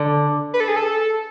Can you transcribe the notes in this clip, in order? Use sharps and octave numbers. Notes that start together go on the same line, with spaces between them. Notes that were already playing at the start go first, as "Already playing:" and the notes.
Already playing: D3
B4
A4
G#4
A4